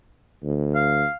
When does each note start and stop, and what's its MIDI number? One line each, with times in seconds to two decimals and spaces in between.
0.44 1.05 38
0.75 1.17 77